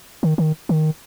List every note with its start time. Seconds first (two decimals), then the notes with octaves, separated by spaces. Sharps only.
0.23 D#3
0.38 D#3
0.69 D#3